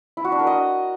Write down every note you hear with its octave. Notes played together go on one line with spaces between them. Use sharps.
E4
F#4
D4
A#4
D#5